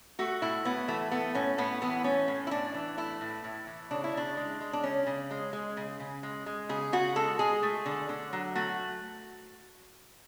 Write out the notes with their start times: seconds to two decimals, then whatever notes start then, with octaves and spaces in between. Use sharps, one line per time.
0.19 A3 F#4
0.42 A2 E4
0.65 A2 B3
0.88 E3 A3
1.11 A3 B3
1.35 A2 C#4
1.58 A2 B3
1.81 E3 B3
2.04 A3 C#4
2.28 A2
2.47 E4
2.51 A2 D4
2.74 E3
2.97 A3 E4
3.21 A2
3.44 A2
3.67 E3
3.91 C#3 D4
4.04 E4
4.14 C#3 D4
4.37 G#3
4.60 G#3
4.73 D4
4.83 C#3 C#4
5.06 C#3
5.31 G#3
5.53 G#3
5.77 C#3
6.00 C#3
6.23 G#3
6.46 G#3
6.69 C#3 G#4
6.93 C#3 F#4
7.16 G#3 A4
7.39 G#3 G#4
7.63 A3
7.86 D3
8.09 D3
8.33 F#3
8.55 A3 F#4